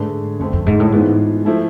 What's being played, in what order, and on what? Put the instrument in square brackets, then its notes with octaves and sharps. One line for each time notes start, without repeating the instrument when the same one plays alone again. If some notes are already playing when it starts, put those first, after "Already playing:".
Already playing: [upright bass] G#2 [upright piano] D3 A3 D4 G#4 B4
[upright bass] F2 [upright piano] D3 A3 C4
[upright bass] F2
G#2
A2
[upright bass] G#2 [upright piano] E3 B3 F4
[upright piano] F3 A3 E4 A4